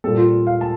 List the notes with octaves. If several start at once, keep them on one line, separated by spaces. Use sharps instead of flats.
A#2 G3 C4 A4
F4
F5
A5